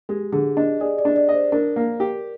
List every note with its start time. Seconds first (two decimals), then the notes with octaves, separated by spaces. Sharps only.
0.09 G#3 G4
0.32 D3 G#4
0.57 D4 D#5
0.80 G#4 D5
0.99 D5
1.05 D4
1.16 D5
1.29 D#5
1.35 C5
1.52 D4 A#4
1.76 A#3
2.00 G4